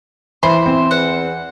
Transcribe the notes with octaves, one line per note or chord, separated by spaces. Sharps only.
E3 E4 C5 B5
C4
E2 F#5